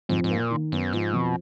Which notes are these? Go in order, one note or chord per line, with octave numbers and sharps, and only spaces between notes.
F2 G#2
G#2
A#3
A#2
D#3
F#2 B3
G#2 F3
F2 B2